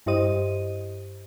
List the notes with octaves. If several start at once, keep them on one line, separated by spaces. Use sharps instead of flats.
G2 E4 G4 C5 D#5 D#7